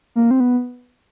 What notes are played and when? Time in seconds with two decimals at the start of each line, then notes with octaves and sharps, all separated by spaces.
0.16 A#3
0.31 C4
0.40 B3